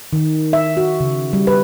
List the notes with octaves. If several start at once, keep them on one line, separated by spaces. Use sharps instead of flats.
D#3
E5
F#4
C#3
G3
B4